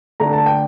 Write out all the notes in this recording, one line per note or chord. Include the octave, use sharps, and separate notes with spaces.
D3 A3 D4 A#5
A5
G5